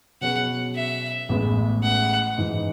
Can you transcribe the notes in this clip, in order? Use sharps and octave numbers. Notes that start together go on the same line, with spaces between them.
B2 F#3 C#4 G#4 B4 F#5
E5
A1 A2 G#3 B3
F#5
G#2 E3 G#3 D#4